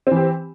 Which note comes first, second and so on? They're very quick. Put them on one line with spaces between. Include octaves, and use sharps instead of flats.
C4 E3 G4